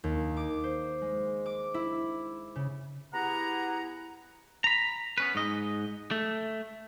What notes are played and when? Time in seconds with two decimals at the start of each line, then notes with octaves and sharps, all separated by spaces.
0.04 D#2
0.37 D6
0.64 C5
1.01 G#3
1.46 D6
1.74 E4
2.56 C#3
3.14 B3 E4 G4 G#4 F#5 A#5
4.64 A#5 B5
5.18 B3 C#4 B4
5.35 G#2 D#5
6.11 A3